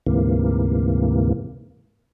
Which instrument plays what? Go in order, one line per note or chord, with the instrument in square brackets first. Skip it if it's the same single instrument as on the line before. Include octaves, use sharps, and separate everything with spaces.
[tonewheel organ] D2 G#2 C3 E3 A#3